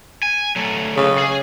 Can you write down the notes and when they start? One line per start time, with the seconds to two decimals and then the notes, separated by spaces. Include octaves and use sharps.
0.23 G#5
0.56 F#3 A3
0.97 C#3
1.18 G#4